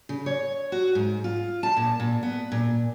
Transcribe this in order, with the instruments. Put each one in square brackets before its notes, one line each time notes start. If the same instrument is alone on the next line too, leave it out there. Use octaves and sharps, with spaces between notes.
[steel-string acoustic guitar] C#3
C#5
F#4
G#2
F4
A5
A#2
A#2
B3
A#2